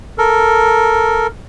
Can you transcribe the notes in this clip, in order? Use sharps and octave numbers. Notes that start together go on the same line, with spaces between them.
A4 A#4